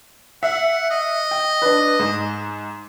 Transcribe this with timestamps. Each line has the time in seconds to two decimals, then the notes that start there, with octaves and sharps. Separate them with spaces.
0.43 E5 F#5
0.91 D#5
1.31 G5
1.62 D4 B4
1.99 G#2